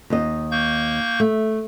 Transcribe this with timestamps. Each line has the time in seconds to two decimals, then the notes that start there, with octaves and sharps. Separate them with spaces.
0.10 D#2 D#4 D#5
0.51 A#3 C#6 G6
1.20 A3